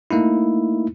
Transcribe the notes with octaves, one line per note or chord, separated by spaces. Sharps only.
A3 A#3 D#4 E4